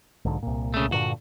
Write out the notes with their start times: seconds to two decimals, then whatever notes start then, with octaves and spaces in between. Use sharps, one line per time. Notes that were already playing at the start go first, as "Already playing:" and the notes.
0.25 B1 G#2 D3
0.43 C2 A#2
0.74 C#3 A3
0.92 G2 A#2 D3 F#4